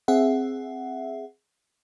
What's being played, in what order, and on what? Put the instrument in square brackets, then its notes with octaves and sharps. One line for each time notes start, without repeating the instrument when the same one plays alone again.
[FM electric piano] C4 G#4 E5 F#5